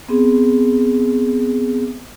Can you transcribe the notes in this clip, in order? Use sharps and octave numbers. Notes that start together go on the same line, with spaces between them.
B3 C4 G#4